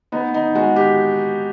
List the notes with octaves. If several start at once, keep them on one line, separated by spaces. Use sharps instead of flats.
B3 D#4
D#4
G#3 F#4
G4